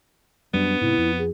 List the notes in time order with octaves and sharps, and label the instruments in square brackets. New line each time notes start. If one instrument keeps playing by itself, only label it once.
[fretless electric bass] F#2 G3 [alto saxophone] B3 [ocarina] D4
[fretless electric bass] G#2 C3 [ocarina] E4
[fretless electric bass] F2
[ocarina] G#4